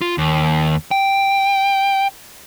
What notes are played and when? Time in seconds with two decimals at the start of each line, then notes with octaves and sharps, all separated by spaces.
0.01 F4
0.18 D#2
0.91 G5